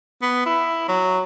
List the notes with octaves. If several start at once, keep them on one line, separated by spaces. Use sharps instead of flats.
B3
E4
F#3